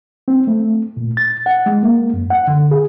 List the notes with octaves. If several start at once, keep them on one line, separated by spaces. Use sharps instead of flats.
C4
A3
A#2
A6
F#5
G#3
A#3
F#2
F#5
D3
G#4